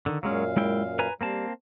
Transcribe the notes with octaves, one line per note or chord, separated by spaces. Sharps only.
D3 D#3
F#2 A#2 F#3 G#3 C#4 F5
G#3 E4 G5
B4 G#5 A#5
G3 A#3 C4 A5